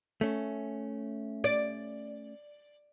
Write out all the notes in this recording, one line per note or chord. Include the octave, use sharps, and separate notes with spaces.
A3 C#4
D5